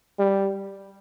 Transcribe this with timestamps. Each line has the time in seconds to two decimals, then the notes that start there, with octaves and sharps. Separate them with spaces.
0.19 G3